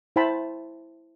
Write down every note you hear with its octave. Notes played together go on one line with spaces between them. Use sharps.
E4 C5 G5 A5 B5